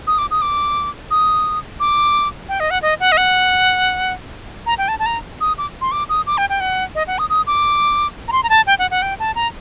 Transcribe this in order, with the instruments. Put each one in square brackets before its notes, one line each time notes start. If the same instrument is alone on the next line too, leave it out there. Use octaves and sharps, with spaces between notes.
[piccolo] D#6
D6
D#6
D6
D#6
D6
G5
D#5
F#5
D#5
F#5
D#5
F#5
A#5
G5
A5
A5
A#5
D#6
D6
C6
D6
D#6
D6
G5
G5
F#5
D#5
F#5
D#6
D#6
D6
A#5
C6
A#5
A5
G5
F#5
F#5
G5
A5
A#5